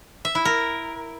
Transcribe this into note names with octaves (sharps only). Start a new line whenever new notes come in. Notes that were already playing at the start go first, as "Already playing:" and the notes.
E5
E4
A#4